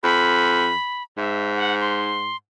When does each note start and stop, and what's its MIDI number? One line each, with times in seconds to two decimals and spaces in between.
0.03 0.72 41
0.03 1.03 83
1.18 2.34 44
1.18 1.54 76
1.56 1.75 78
1.80 2.36 84